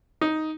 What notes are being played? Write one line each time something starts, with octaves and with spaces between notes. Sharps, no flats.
D#4